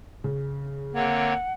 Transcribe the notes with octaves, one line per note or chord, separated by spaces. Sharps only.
C#3
D3 A#3 C4 C#5 F#5